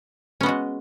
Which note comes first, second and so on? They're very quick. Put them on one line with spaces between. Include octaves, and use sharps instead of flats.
C#4 B3 F#4 G#3